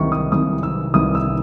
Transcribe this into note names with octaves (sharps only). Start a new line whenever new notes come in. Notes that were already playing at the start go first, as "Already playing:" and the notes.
Already playing: C2 C3 D#3 C#6
D#6
C2 C3 D#3 D#6
E6
C2 C3 D#3 D#6
E6